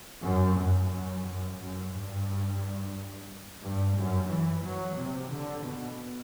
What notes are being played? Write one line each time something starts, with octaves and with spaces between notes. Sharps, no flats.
F#2
F#2
F#2
F#2
F#2
G2
G2
F#2
E3
F#3
C3
D3
B2